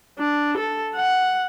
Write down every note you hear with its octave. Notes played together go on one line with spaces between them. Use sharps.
D4
A4
F#5